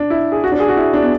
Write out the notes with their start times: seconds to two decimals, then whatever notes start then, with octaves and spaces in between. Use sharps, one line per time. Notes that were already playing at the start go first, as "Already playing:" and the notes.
Already playing: D4
0.10 E4
0.32 G#4
0.44 F#4
0.52 D4
0.60 G#4
0.68 F#4
0.77 E4
0.93 D4
1.02 B3